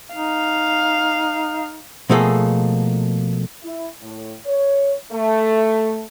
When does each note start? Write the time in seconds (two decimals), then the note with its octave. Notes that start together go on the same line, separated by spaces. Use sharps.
0.15 D#4 F5
2.10 B2 F3 A3 A#3 G#4 A4
3.64 E4
4.01 A2
4.46 C#5
5.12 A3